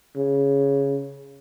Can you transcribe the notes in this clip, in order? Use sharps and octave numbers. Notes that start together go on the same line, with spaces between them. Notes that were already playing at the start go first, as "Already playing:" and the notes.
C#3